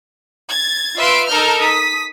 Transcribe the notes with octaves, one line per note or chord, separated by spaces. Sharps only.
G#6 A6
F4 B4 E5 F5 C6 D7
D#4 A4 A#4 A5 F6 G6
D#6 B6